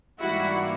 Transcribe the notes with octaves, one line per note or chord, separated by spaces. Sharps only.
G#2 E3 G3 A#3 E4 F#4